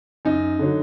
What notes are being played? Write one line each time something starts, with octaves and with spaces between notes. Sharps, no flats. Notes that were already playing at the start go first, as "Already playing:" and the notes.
F#2 D#4
D3 F#3